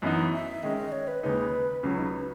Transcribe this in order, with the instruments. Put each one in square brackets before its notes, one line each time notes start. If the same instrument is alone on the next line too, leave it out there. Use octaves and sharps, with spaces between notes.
[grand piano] F#2 E3 B3 D#4 [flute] D#5
[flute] E5
[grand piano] D#3 G#3 C#4 [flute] D#5
[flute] D#5
C#5
B4
[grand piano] D#2 C#3 G#3 D#4 [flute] B4
[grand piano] C#2 C#3 F#3 [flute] C#4
[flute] D#4
B4